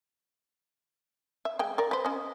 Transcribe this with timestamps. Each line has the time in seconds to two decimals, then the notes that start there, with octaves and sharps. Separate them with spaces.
1.45 E5
1.59 G#3 G5
1.78 A#4 D5
1.91 B4 C5
2.05 C#4 D#5